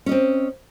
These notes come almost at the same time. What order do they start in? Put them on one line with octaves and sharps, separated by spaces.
C#4 D#5 C4